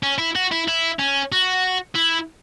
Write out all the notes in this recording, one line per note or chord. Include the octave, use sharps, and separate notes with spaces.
C#4
E4
F#4
E4
E4
C#4
F#4
E4